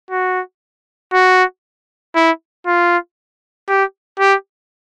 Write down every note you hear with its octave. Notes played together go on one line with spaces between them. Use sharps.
F#4
F#4
E4
F4
G4
G4